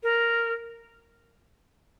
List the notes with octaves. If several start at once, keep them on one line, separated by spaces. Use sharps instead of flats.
A#4